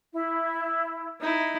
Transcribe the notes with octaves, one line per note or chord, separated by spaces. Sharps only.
E4
D#4 E4